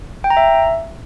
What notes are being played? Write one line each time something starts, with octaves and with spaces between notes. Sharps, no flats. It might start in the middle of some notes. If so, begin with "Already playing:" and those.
G5
A#5
E5